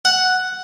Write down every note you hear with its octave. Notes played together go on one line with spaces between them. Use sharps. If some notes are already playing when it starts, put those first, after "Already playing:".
F#5